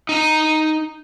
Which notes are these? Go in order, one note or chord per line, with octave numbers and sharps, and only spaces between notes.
D#4 A#5